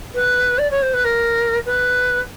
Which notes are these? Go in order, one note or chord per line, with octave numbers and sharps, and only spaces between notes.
B4
D5
C#5
C5
B4
A#4
B4